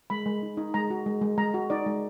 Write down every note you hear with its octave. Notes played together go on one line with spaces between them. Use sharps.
G#3 B5
G#3
D#4
D#4
G#3 A#5
F#4
G#3
G#3
G#3 A#5
F#4
D#4 D5
G#3